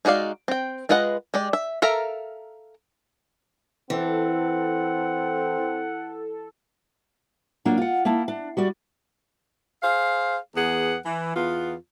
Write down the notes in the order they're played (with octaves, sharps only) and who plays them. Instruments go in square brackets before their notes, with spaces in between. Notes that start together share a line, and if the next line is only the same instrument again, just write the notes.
[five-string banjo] G#3 D#4 F#4 D5 F5
C4 G5
G#3 F4 B4 D#5 F#5
G#3 G4 D5
E5
A4 A#4 E5 F5 A#5
[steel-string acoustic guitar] E3 [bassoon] C4 [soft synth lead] A4 [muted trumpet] F#5
[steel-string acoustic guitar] F#3 A#3 D4 F4
F4 F#5
A#3 D#4 E4 A5
D4
G3 F#4 D5
[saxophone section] G#4 C5 F5
E2 B3 G#4 F#5
E3
E2 B3 F4